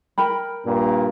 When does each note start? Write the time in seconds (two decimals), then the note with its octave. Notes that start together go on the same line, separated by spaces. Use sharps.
0.18 A#4 G5 B5
0.65 G2 A#2 A#3